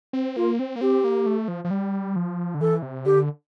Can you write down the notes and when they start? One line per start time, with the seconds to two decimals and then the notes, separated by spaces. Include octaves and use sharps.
0.13 C4
0.36 A#3 F4
0.59 C4
0.76 A#3
0.81 C4 G4
1.04 A#3
1.26 A3
1.48 F3
1.65 F3
1.71 G3
2.16 F3
2.54 D3
2.61 E3 A4
2.82 C3
3.05 D3 G4